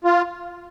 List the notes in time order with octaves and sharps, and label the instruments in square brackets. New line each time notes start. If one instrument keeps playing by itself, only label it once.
[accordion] F4